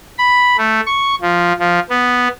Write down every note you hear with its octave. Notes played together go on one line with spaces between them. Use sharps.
B5
A3
C#6
F3
F3
B3